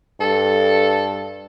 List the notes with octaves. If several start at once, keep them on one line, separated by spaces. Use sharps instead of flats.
G2 A4